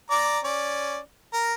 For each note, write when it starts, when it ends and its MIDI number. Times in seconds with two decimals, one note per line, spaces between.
0.10 0.39 74
0.10 0.39 82
0.10 0.39 86
0.44 0.98 61
0.44 0.98 74
1.33 1.54 70
1.33 1.54 82